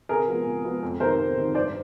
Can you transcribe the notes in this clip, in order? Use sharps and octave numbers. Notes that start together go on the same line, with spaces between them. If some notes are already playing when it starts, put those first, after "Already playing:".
C3 G#4 A#4
F3 G#3 B3
C3
F3 G#3 B3
F2
C3 D#3 A#4 C5
F2
C3 D#3
G2 C5 D5